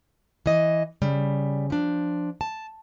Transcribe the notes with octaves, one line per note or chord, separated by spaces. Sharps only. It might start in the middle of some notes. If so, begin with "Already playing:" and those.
E3 D#5
C#3 G3
F3 D4
A5